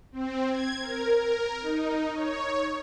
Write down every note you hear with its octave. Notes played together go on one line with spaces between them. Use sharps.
C4
G#6
A#4
A#4
D#4
C#5